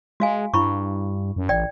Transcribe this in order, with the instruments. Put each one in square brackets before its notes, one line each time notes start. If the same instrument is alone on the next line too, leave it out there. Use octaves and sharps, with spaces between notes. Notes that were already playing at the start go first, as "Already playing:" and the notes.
[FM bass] G#3 [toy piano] F#4 F5 G#5
[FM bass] G2 [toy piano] E4 B5 C#6
[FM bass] F#2
[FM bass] A1 [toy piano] D5 G5